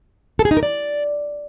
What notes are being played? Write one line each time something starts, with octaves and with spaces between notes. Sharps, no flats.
A4
G#4
D#4
A#4
D5